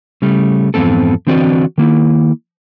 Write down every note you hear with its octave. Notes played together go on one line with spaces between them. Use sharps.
C#3 G3 A3
F2 G#2 E3 B3 C4 A4
D3 E3 C4 F#4 D5 D#5
D#3 A#3 E4